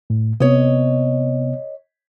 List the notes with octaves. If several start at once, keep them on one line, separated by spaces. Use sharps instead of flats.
A2
C3 B3 C#5 D#5